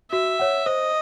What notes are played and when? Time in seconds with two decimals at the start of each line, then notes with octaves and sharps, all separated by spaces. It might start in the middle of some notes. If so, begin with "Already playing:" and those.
0.12 F#4 E5
0.39 C#5 F#5
0.66 C5 D#5